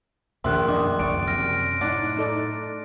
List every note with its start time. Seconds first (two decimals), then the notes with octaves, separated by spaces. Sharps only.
0.44 A#1 D#2 B2 D#3 A3 E5 C6 F#6
0.68 F#2 D4 D#5 D6
0.99 F#1 C#2 F#2 D5 C#6 D7
1.28 F#2 C3 F6 A#6 D7
1.81 A2 D4 D#4 F#5
2.17 D#4 A4 D5